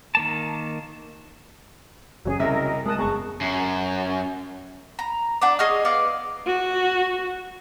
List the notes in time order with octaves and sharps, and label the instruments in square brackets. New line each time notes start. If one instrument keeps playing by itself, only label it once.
[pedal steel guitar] D#3 A#3 A5
[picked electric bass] F#1 [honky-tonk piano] F#3 C#4 [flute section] G#4
[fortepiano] C2 E5 [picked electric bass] C#3 [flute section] A#4 D#5
[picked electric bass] G#3 [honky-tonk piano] A#4 F#6 [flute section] A5 D#6
[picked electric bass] F#1 B3 [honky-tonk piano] G#4 A5 [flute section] C#6
[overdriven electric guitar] F#2
[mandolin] A#5
D4 F#5 D6
G#4 D#5 C#6 F6
B3 D5 F5 D6
[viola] F#4